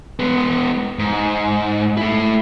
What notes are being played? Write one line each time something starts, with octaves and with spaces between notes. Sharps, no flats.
G#3 B3
G#2
A3 E4